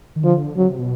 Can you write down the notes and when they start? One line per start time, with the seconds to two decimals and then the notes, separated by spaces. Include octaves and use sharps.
0.16 D#3
0.24 D3 F3
0.56 C#3 F#3
0.67 C3
0.78 B2